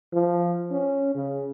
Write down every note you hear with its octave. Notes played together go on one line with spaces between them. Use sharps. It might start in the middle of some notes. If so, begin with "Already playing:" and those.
F3
C#4
C#3